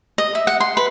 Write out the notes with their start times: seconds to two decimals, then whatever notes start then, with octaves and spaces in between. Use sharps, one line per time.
0.18 D#5
0.35 E5
0.47 F#5
0.60 C6
0.77 B4